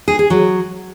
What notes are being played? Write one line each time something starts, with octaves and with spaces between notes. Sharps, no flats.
G#4
G#4
F#3